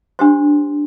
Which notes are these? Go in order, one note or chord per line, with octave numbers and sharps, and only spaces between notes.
D4 G4 C5 C6